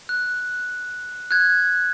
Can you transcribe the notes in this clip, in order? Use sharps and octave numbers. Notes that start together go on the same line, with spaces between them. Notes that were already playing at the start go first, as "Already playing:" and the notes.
F#6
F#6 G#6